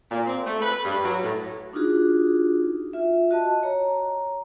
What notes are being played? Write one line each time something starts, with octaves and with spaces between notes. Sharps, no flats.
A#2
C4
A3
B4
G2
F#3
A2
D4 D#4 F4 F#4 G#4
F4 E5
F#4 D#5 A5
C#5 A#5